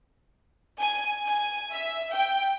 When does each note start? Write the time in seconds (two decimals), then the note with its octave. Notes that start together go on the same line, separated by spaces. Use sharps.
0.79 G#5
1.26 G#5
1.72 E5
2.13 G5